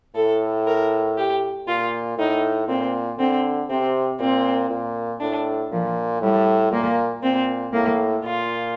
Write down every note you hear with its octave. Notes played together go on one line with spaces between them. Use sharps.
A2 A4
A#4
G4
A#2 F4
A2 D#4
A#2 C4
D3 C4
C3 C4
A#2 C4
A#2
A2 D4
A#2 F3
A2 G3
A#2 A#3
A#2 C4
A2 A#3
A#2 F4